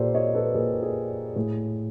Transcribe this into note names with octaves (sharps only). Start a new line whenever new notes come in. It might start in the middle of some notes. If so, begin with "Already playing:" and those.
Already playing: A#2 G4 A4 C5 D5
C#5 D#5
A4 B4
A#2 G#4 A#4
G#4
A2 G#4